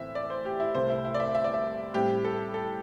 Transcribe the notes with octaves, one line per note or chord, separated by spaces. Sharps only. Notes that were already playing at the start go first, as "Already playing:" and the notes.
Already playing: A2 E3 C4 E5
D5
C5
G4
E4
C2 C3 A3 C4 C5
E4
E4
D5
E5
E5
D5
E5
A2 G3 C4 G4
A4
A4